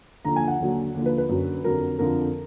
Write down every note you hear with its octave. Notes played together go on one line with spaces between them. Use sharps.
D#2 D3 F3 A#5
G#5
F#5
D#2 D3 F#3
D#2 D3 F3
B4
B4
F#2 D3 F#3
F2 D3 F#3 A#4
F2 D3 F3 A#4